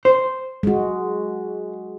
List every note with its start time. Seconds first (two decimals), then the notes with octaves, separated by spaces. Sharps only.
0.05 C5
0.63 G#3 F#4